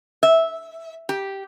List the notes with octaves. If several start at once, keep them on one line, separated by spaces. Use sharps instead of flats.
E5
G4